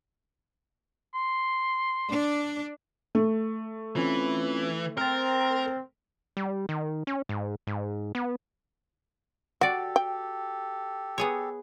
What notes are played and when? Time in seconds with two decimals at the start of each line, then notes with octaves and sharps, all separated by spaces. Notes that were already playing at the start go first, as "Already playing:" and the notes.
1.14 C6
2.09 D4
3.15 A3
3.96 E3 C4 C#4 F4
4.98 C4 A#4 F6 A6
6.37 G3
6.69 D#3
7.07 C#4
7.29 G#2
7.67 G#2
8.15 B3
9.61 F#4 G4 A4 D5 F#5
9.96 G5
11.18 B3 G#4 C#5